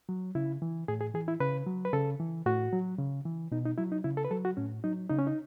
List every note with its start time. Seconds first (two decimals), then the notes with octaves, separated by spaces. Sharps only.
0.09 F#3
0.35 C#3 E4
0.62 E3
0.88 A2 G#4
1.01 G#4
1.14 E3 G#4
1.28 E4
1.40 C#3 B4
1.67 F#3
1.85 B4
1.93 C#3 A4
2.20 E3
2.46 A2 F#4
2.73 F#3
2.98 C#3
3.26 E3
3.52 B2 D#4
3.65 D#4
3.78 F#3 E4
3.92 D#4
4.04 C#3 E4
4.17 A4
4.25 B4
4.31 F#3 A4
4.45 F#4
4.57 A2 C#4
4.84 F#3 D#4
5.10 C#3 D#4
5.18 C#4
5.27 D#4